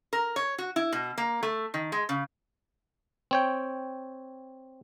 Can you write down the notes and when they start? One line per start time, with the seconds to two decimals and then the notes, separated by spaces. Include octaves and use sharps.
0.13 A#4
0.36 C#5
0.58 F#4
0.76 E4
0.92 B2
1.18 A#3
1.43 A3
1.74 D#3
1.92 G#3
2.09 C#3
3.31 C4 C#5 G5